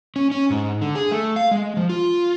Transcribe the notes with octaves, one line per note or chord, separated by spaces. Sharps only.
C#4
C#4
G#2
D3
G#4
A3
F5
G#3
F3
F4